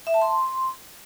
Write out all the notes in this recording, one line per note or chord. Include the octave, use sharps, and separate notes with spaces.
E5
A5
C6